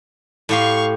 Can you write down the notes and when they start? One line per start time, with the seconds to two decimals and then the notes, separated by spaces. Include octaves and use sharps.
0.49 A2 G4 F5 C6 C#6